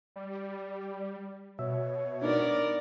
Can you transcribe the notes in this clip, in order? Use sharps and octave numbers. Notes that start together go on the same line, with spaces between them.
G3
B2 C#5 E5
B3 D4 D#4 A#4 D5